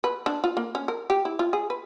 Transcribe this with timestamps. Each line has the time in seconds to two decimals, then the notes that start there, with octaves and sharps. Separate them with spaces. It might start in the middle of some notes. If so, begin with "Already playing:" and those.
0.04 B4
0.26 D4
0.44 F4
0.57 A#3
0.75 C#4
0.88 A#4
1.10 G4
1.25 E4
1.39 F4
1.53 G#4
1.70 B4